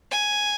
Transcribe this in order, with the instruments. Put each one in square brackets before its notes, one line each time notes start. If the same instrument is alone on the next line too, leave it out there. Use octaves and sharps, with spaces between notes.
[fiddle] G#5